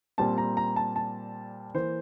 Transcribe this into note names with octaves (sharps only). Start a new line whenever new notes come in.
A#2 G3 C4 A5
A#5
A#5
A5
A5
E3 A#3 C5